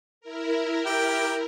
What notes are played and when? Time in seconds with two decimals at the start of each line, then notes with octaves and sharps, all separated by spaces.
0.21 E4 A#4
0.86 G4 G5